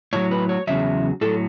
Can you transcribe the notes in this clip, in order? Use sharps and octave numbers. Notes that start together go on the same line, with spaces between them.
A2 F#3 C#5
B4
C#5
E2 C#3 F#3 E5
A2 F#3 A4